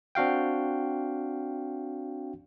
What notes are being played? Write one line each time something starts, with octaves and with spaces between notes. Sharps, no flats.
C4 D4 F#4 F5 G5